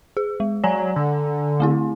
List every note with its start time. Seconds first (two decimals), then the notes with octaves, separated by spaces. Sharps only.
0.17 G#4
0.40 G#3
0.64 F#3 D5 G#5 A#5
0.96 D3
1.60 A3 C4 E4